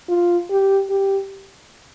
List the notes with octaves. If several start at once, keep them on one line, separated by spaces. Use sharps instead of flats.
F4
G4
G4